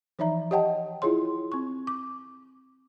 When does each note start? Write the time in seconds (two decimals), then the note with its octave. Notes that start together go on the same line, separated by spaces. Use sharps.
0.19 E3 F3 D#4 D5 E5 A#5
0.51 G4 C#5 D#5 F#5 G5 A5
1.02 E4 F4 G#4 C#5 C6
1.52 C4 C#6
1.87 D6